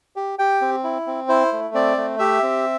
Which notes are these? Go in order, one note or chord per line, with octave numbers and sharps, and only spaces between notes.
G4
G4 G5
C4
E4
C4
E4 C5
A3
C4 D5
A3
G4 E5
C4